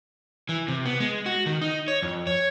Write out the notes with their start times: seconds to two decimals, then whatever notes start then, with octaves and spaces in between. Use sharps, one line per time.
0.49 E3
0.68 C3
0.86 B3
1.00 G#3
1.26 F#4
1.46 D#3
1.62 D#4
1.88 C#5
2.02 F2
2.27 C#5